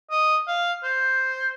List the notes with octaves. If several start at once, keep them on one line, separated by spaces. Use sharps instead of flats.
D#5
F5
C5